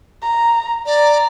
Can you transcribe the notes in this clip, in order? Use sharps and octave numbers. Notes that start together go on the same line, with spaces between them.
A#5
D5 A#5